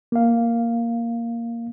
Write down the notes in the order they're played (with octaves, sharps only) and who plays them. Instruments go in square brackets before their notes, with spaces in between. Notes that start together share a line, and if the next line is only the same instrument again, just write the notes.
[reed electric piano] A#3 F5